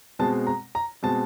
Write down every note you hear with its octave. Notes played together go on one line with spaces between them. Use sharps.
B2 G#3 C4 A5
A#5
A#5
B2 G#3 C4 A5